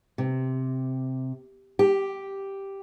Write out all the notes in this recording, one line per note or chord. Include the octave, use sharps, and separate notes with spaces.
C3
G4